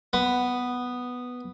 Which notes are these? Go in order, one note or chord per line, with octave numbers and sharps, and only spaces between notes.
B3